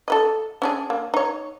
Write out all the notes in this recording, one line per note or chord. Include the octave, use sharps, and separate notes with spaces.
A4 B4 D#5
C#4 D4 G#4
A#3
D#4 C#5